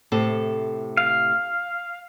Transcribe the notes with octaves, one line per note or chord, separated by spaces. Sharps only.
A2 C3 A4
F5